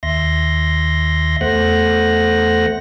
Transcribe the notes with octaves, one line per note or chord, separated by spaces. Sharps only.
D#2 E5 C6 A#6
E2 A3 C5 F#5 F#6 A#6